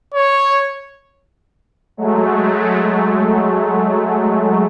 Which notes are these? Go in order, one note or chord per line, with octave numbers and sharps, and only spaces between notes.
C#5
F#3 G#3 A3